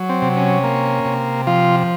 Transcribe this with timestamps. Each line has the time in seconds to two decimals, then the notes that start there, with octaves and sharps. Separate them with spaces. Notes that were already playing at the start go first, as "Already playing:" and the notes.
Already playing: F#3
0.09 C4
0.22 C3
0.37 C#4
0.63 A#3
1.05 C3
1.47 F3 F4